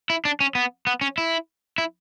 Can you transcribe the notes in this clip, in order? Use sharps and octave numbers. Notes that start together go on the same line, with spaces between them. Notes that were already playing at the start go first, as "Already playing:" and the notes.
E4
D4
C#4
B3
B3
C#4
E4
E4